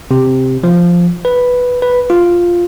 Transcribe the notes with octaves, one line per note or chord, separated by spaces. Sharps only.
C3
F3
B4
B4
F4